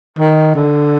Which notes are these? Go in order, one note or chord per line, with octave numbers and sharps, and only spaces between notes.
D#3
D3